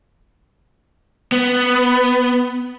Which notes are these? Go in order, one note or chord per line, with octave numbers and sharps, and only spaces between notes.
B3